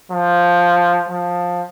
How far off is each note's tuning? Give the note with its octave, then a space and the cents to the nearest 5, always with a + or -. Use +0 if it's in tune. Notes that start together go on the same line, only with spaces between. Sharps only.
F3 +5
F3 +15